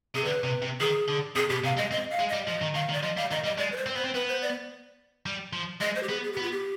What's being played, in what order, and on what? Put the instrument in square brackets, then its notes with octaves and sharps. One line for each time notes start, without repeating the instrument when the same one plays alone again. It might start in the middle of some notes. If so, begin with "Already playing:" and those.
[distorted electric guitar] C3 [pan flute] G#4
[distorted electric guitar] D3 [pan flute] B4
[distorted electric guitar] C3
C3
[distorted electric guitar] D#3 [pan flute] G#4
[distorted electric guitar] D3
[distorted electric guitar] C3 [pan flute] G#4
[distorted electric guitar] B2 [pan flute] G4
[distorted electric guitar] C3 [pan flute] F5
[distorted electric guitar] G#3 [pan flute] D#5
[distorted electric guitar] C4 [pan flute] D#5
[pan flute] F5
[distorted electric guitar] G#3
[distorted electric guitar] G3 [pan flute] D#5
[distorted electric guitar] F3 [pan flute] D#5
[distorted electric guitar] D#3
[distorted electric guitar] D#3 [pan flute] F5
[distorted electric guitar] D#3
[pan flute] D5
[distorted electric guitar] F3 [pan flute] D#5
[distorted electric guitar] G3 [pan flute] F5
[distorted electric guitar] D#3 [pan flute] D#5
[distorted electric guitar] G3 [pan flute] D#5
[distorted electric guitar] G#3 [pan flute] D5
[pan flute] B4
C5
[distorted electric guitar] C4
[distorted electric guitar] B3 [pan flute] C5
[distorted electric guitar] C4
[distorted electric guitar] B3 [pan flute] B4
[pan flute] C5
D5
[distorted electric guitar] G3
F3
[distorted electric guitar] G#3 [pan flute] D#5
[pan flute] C5
G4
[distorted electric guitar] B3 [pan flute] G#4
[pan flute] G#4
G4
[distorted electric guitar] B3
[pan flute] F4
G4